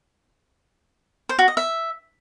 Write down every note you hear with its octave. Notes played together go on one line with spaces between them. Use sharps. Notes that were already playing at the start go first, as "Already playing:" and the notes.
C5
F#4
D#5
E5